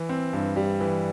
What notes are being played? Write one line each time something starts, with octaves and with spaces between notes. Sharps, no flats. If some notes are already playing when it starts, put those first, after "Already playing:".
Already playing: E3
C4
G2
G3
E3